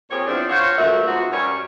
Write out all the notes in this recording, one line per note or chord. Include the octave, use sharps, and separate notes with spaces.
A#2 C4 G4 G#4 C#5
E2 F3 F#3 C4 D4 D5
D4 F4 F#4 C5 C#5
D2 G2 A#2 F#4 E5
G#2 F3 B3 F#4
F#2 G3 C#5